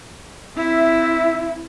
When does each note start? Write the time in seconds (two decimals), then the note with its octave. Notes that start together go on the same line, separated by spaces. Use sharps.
0.56 C4 E4 E5